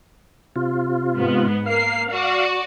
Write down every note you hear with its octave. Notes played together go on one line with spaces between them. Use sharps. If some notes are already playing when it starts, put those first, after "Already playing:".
C3 F4
G#2 B3
A#3 F5 C7
F#4 D5